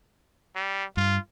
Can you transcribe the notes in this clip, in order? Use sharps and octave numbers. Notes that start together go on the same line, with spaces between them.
G3
G2 F4